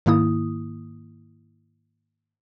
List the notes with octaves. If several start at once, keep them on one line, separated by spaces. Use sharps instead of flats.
G#2 D#3 A#3 E4 D#6